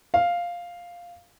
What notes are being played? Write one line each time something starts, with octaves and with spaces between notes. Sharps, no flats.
F5